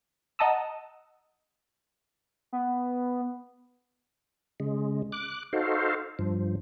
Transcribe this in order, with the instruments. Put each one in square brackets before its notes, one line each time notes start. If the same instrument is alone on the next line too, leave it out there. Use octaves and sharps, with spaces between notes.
[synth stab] D#5 F#5 A5 A#5 D#6 E6
[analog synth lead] B3
[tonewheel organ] C#3 G#3
D6 F#6
D#4 F#4 A4 C5 F5
G2 F3